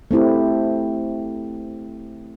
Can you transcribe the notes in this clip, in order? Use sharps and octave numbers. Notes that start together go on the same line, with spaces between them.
A3 C4 E4 G4